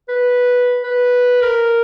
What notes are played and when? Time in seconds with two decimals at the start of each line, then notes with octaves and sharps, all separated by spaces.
0.09 B4
0.84 B4
1.42 A#4